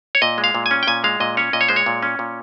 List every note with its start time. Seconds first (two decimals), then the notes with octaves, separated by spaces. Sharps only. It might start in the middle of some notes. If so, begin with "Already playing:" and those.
0.15 C#5
0.22 A#2 D#5
0.38 G#3
0.44 F5
0.55 A#2
0.66 G#5
0.71 C#4
0.83 G5
0.87 A#2 G#5
1.04 G#3 F5
1.20 A#2 D#5
1.37 C#4 C#5
1.53 A#2 D#5
1.61 C#5
1.69 G#3 C5
1.76 C#5
1.86 A#2
2.03 C#4
2.19 A#2